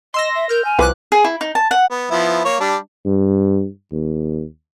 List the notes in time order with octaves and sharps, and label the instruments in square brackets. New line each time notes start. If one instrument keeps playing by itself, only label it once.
[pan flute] D#5 [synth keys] C6 E6 A#6
[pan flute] E5
[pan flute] A#4 [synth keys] F6 G6
[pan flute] G#5
[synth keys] C2 D6 F#6 [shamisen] F3 B4
[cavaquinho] G#4
E4
D#4
A5
F#5
[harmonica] B3
F3 B3 E4
A#3 C#5
G3 D4
[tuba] G2
D#2